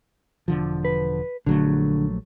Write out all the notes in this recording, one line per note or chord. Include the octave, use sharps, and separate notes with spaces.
E1 D3 F3
B4
A#1 D3 F#3 A3